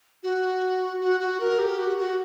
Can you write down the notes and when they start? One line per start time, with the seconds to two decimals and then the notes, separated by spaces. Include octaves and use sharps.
0.23 F#4
1.01 F#4
1.20 F#4
1.40 A#4
1.59 G4
1.79 F#4
1.98 F#4